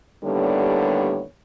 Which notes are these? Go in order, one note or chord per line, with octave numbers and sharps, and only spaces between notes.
D#2 A2 D3 G3 B3 C#5